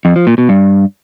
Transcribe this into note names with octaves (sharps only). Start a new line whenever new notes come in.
F2
F3
A#2
B2
G2